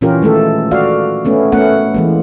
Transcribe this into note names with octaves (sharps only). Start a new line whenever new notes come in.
A#2 E3 C#4 F4 G4 A#4
D#3 G#3 A3 A4
F#4 D5 F5
A3 B3 C#4
A3 B3 C#4 A#4 F#5
E3 G#3 A#3